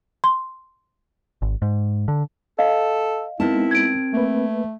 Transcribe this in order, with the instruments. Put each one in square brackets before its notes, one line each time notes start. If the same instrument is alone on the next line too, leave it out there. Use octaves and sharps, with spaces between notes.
[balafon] C6
[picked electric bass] G#1
G#2
D3
[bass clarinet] A4 [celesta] D#5 F5
[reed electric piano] G#3 B3 D#4 [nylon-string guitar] C4 A#4 A5 [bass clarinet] E4
[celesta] G#6 D7
[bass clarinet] A3 [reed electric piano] A#3 B4